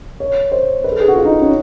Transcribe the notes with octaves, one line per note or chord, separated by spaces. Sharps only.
C#5
C5
B4
A4
G#4
F#4
F4
D#4
C#4